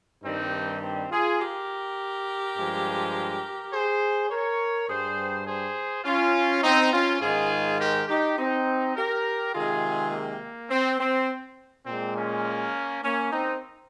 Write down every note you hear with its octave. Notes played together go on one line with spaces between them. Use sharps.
G2 D#3 G3 C4 D#4
C4
F4 G#4
G4 A#4
G2 F3 G#3
G#4 C5
A#4 C#5
G2 G3 G#4 C5
G#4 C5
C#4 F4
C4 D#4
C#4 F4
G#2 D#3 G#3 F4 G#4
G4 A#4
D#4 G4
C4 D#4
G4 A#4
C3 D#3 G#3 F4 G#4
A#3
C4
C4
A#2 G#3 C4
A#3 C#4
A#3 C#4
C4 D#4